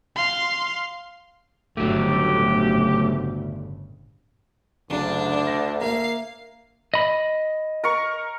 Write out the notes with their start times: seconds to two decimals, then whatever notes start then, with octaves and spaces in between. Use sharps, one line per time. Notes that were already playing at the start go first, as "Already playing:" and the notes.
0.16 F5 C6
1.77 G1 D2 A2 C#3 F#3 A3 G4
4.90 F#1 D2 D4
5.47 A#6
5.81 A#3 E5 F5
6.94 D#5 B5
7.84 A#4 C#6